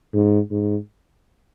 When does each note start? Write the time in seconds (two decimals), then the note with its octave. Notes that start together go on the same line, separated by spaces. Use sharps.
0.14 G#2
0.51 G#2